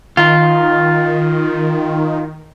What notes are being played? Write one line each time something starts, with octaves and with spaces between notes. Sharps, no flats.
D#3 F4